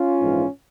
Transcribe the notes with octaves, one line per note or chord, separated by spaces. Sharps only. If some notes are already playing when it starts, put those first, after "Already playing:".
Already playing: C#4 F4
A#1 G#2 E3